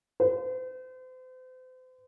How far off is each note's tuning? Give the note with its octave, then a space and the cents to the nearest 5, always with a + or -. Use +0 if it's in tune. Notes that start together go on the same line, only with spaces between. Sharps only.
C5 -40